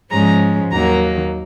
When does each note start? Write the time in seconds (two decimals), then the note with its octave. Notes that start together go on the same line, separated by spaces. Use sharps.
0.11 G#2 F3 G#3 C#4 A#5
0.71 D#2 D#3 F#3 A#3 A#5